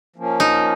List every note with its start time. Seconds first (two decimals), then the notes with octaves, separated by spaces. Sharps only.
0.16 F3 A#3 C#4
0.40 D#4